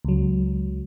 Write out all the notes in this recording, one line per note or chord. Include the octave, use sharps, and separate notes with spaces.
C#2 F#3